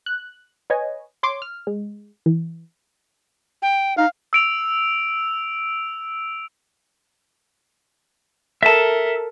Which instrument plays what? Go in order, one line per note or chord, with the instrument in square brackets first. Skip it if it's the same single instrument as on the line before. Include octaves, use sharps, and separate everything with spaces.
[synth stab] F#6
B4 C#5 D#5 G#5
C#5 C6 D6
F6
G#3
E3
[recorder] G5
[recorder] D#4 [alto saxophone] F5
[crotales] E6 D7 F7
[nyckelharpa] A4 A#4 [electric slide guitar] E5 A5